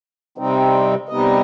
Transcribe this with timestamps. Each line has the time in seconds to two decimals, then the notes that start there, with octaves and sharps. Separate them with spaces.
0.38 C3 G3 C4 D#4
1.09 C3 G3 B3 D#4 D#5